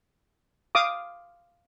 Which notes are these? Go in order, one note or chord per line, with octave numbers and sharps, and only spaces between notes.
F5 D6 D#6